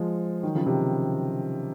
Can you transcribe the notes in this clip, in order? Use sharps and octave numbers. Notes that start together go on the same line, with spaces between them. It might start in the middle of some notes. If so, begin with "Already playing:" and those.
Already playing: F3 G#3
D#3 F#3
C#3 F3
C3 D#3